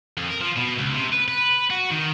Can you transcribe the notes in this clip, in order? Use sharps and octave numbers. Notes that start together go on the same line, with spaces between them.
F2
A#4
F3
B2
C#2
C3
B4
B4
F#4
D#3